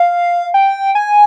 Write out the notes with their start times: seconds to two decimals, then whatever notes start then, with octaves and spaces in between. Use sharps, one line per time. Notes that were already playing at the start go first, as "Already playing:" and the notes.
Already playing: F5
0.54 G5
0.95 G#5